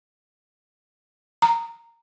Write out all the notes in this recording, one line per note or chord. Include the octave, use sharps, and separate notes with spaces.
A#5